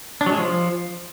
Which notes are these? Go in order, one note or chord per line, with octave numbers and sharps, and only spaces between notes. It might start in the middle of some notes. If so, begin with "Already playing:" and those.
D4
F#3
G#3
F3